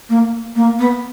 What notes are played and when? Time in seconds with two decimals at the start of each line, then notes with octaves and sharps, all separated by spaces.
0.09 A#3
0.55 A#3
0.79 B3